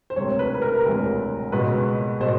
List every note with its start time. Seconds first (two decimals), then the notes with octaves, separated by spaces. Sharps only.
0.10 C5
0.16 E1 D2 C3 C#5
0.39 B4
0.55 B4
0.62 A#4
0.84 E1 D2 C3
1.52 C#2 B2 G#3 B4
2.21 B2 G#3 C5